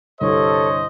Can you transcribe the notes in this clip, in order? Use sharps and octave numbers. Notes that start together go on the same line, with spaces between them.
C2 G2 D3 A4 C5 C#5 D#5